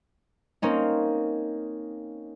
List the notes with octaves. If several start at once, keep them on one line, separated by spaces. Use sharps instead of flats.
A#3 C4 C#4 D#4